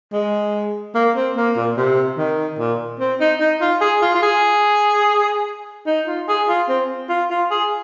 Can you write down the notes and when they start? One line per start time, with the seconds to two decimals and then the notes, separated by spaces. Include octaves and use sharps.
0.13 G#3
0.95 A#3
1.15 C4
1.36 A#3
1.56 A#2
1.77 C3
2.18 D#3
2.59 A#2
3.00 C4
3.20 D#4
3.40 D#4
3.61 F4
3.81 G#4
4.02 F4
4.14 F4
4.23 G#4
5.86 D#4
6.07 F4
6.28 G#4
6.48 F4
6.69 C4
7.10 F4
7.30 F4
7.51 G#4